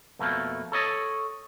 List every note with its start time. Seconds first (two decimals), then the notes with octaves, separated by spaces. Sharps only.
0.19 F2 B2 A3 A#3
0.72 A4 C#5 D#5